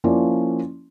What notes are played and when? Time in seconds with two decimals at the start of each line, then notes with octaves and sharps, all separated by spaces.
0.04 F3 A#3 C#4 E4 D5